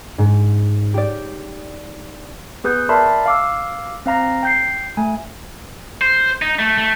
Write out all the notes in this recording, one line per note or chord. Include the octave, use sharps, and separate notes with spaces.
G#2
G4 D5
B3 G#4 B4 D#6 G6
A#4 D5 E5 A5 B5 C6
F5 D6 E6
C4 F5 A#5 A#6
G5 G6 C7
A3 G#5
C5
D#4
A3
A3